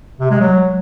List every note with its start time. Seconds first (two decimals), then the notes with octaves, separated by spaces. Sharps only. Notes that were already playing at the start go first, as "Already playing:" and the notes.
0.20 C3
0.30 G#3
0.41 F#3